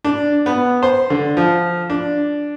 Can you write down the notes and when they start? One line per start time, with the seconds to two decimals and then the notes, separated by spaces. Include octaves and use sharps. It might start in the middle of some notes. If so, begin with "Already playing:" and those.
0.05 D4
0.46 B3
0.83 C5
1.10 D3
1.37 F3
1.90 D4